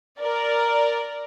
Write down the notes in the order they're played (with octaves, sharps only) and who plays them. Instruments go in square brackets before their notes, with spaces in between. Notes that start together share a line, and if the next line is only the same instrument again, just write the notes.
[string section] A#4 D5